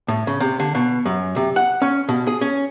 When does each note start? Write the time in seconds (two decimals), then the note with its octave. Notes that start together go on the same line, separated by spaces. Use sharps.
0.08 A2
0.27 C#3
0.40 C3
0.60 D3
0.75 B2
1.05 F#2
1.36 C3
1.56 F#5
1.82 C#4
2.09 B2
2.27 G#4
2.41 C#4